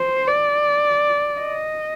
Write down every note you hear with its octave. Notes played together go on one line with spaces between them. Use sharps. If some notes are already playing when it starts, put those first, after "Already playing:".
Already playing: C5
D5
D#5